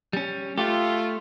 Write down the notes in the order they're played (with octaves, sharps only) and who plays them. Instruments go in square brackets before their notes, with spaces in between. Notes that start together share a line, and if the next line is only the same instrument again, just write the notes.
[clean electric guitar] G3 C#4
[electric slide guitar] A3 [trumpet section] F4 [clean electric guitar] G4